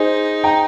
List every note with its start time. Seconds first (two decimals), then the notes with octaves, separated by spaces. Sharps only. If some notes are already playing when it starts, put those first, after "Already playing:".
Already playing: D#4 G#4 C5
0.44 G5 A#5